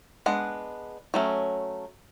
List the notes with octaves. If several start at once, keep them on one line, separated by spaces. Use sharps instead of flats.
G#3 B3 D4 F#5
F#3 A3 C#4